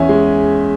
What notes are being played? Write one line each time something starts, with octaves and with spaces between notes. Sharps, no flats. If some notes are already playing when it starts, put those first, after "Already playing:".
Already playing: E2 C#4 E5 G#5
G#3